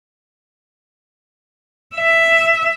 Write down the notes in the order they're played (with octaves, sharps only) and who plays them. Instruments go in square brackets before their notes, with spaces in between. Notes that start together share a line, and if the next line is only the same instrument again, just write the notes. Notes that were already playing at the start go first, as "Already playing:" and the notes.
[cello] E5